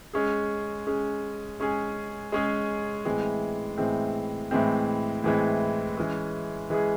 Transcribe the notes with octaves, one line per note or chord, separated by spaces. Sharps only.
G#3 C#4 G#4
G#3 C#4 G#4
G#3 C#4 G#4
G#3 C#4 G#4
A2 E3 G#3 C4
A2 E3 G#3 C4
A2 E3 G#3 C4
A2 E3 G#3 C4
E3 G#3 C#4 G#4
E3 G#3 C#4 G#4